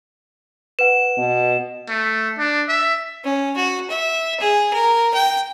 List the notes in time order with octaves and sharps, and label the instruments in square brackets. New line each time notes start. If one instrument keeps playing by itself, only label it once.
[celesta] B4 F#5 [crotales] E7
[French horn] B2
[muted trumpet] A3
D4
E5
[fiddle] C#4
F#4
E5
G#4
A#4
G5